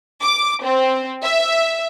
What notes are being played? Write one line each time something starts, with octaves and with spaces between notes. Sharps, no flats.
D6
C4
E5